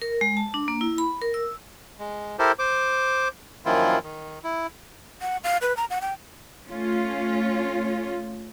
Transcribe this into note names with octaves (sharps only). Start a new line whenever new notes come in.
A#4
G#3
A5
D4
A#3
E4
B5
A#4
E6
G#3
E4 G4 A4 A#4 C5
C5 D6
F#2 D#3 F3 A#3 E4 F4
D#3
E4
F#5
F5
B4
A#5
F#5
G5
A3 C#4 F4